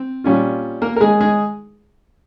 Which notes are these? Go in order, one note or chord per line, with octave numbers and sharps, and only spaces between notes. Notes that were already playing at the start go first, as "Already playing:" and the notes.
Already playing: C4
A#2 G3 C#4 F4
A#3 A#4
A#4
G#3 G#4
G#3 G#4